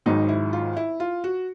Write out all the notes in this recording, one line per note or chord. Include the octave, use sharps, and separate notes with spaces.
G#1 G#2 D#3 F#3 D#4
E4
F4
E4
F4
F#4